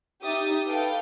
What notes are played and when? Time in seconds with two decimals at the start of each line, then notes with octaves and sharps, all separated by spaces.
0.23 D#4 G4 E5 D#6 A6
0.67 A4 B4 F5 G5